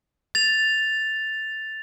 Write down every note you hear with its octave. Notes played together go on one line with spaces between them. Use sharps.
A6 F7